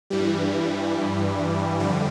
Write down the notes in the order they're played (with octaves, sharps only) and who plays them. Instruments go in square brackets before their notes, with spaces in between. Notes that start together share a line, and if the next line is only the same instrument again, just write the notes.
[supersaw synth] G2 E3 G3
F2 D3 G3